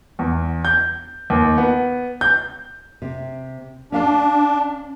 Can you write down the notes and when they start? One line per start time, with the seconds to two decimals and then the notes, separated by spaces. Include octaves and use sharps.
0.19 E2
0.65 G6
1.30 D#2
1.58 B3
2.21 G6
3.02 C3
3.92 C#4 D4 F5 A5